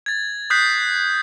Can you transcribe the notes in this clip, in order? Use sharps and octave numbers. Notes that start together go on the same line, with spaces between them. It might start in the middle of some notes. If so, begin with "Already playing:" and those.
G#6 A6
D#6 F#6 G6 B6 C7